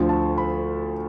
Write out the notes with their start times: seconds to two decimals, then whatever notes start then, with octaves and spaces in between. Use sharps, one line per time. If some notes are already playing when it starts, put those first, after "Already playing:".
Already playing: D2 D3 F3
0.09 A5
0.38 B5